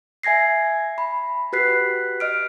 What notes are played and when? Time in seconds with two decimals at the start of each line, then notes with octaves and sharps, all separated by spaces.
0.23 E5 G#5 G#6 A#6 C7
0.98 B5
1.53 F#4 G4 B4 F#6 B6 C7
2.20 D#5 F6 D7